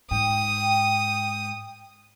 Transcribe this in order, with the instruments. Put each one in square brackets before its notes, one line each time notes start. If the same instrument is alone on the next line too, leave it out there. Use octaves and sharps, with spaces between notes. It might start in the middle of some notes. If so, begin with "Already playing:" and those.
[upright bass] G#2 [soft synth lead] G5 [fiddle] D#6